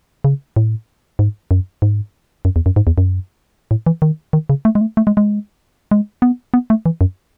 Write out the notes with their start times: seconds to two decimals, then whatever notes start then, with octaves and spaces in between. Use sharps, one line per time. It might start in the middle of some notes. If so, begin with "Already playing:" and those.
0.24 C#3
0.56 A2
1.19 G#2
1.51 F#2
1.82 G#2
2.45 F#2
2.56 E2
2.66 F#2
2.76 G#2
2.87 E2
2.98 F#2
3.71 A2
3.86 E3
4.02 D#3
4.33 D#3
4.49 C#3
4.65 A3
4.75 G#3
4.81 A3
4.97 A3
5.07 G#3
5.17 G#3
5.91 G#3
6.22 B3
6.54 B3
6.70 A3
6.86 E3
7.01 F#2